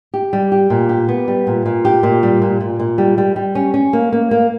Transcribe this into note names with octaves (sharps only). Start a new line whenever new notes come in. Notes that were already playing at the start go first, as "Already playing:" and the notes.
G4
G3
G4
A#2
G4
B3
G3
A#2
A#2
G4
A#2
G3
A#2
A#2
A#2
G3
G3
G3
C#4
C#4
A#3
A#3
A#3